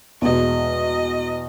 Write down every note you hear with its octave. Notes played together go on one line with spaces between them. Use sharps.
E2 B2 G#3 D#5